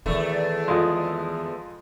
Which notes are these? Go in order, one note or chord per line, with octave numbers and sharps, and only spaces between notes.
E2 D#3 E3 A3
F2 G#3